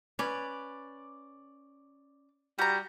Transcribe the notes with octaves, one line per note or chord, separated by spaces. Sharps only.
C#4 B4 D5
G3 F#4 A#5